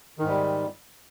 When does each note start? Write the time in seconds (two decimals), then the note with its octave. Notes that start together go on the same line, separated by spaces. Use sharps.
0.19 D#3
0.23 G#2
0.28 G3